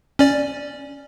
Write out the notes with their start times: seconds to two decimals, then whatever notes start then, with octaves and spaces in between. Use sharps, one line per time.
0.19 C#4 D5